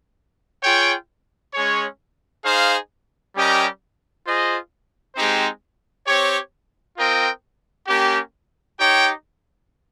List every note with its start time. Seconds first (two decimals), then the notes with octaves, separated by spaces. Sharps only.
0.63 F4 G#4 C#5 G5
1.53 G#3 C#4 G#4 C#5
2.44 D#4 G#4 C5 F5
3.34 G3 C#4 G4 A#4 D#5
4.25 F4 G#4 C5 D#5
5.16 G#3 C4 D#4 G4 C5
6.06 C4 G4 C#5
6.97 C4 F4 A#4 D#5 G5
7.87 A#3 C#4 G4
8.79 D#4 G4 C#5 G5